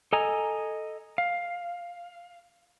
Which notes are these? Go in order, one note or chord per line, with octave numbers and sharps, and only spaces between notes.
A4 D#5 G#5 A#5
F5